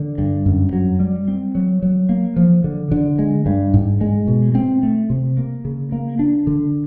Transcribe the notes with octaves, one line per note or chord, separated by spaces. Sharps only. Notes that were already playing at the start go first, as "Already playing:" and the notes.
Already playing: D3
G2
F#2
F#3
G3
C4
F#3
F#3
A#3
F3
D3
D3
G#3
G2
G#2
G#3
B2
C4
A3
C3
A#3
C#3
A#3
D4
D3